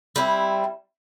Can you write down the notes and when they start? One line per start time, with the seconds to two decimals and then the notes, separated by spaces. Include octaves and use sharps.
0.16 G3 C4 E4